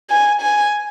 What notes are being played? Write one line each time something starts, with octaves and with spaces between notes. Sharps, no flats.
G#5
G#5